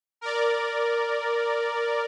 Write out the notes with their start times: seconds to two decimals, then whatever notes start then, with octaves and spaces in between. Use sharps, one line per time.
0.21 A#4 D5